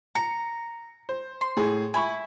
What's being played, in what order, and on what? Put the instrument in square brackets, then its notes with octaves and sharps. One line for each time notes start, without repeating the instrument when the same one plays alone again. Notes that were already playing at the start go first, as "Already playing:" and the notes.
[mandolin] A#5 [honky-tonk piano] C#7
[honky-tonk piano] C5
[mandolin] C6
[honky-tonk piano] A2 G#4
[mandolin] E4 [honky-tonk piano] G#5 B5 C#6